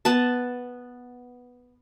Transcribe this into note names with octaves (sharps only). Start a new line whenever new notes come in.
B3 A5